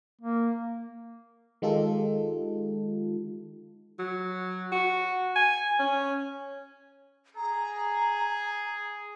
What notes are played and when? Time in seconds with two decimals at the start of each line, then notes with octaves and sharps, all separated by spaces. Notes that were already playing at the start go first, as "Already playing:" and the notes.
0.21 A#3
1.62 D#3 G#3 D#4 F4 G4 A4
3.99 F#3
4.72 F#4
5.35 G#5
5.80 C#4
7.37 G#4 A#5